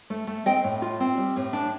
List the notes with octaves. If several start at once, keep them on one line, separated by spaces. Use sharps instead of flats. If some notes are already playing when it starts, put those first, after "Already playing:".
A3
A3
C4 D#5 G5
A2
F4
C4
G3
A2
D4